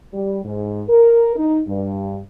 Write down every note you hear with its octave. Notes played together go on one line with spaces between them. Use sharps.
G3
G#2
A#4
D#4
G2